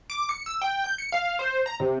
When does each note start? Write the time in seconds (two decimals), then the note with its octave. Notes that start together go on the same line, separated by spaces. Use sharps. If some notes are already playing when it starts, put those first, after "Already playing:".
0.10 D6
0.29 C#7
0.46 E6
0.62 G5
0.84 G6
0.98 C#7
1.12 F5
1.39 C5
1.66 A#5
1.80 C3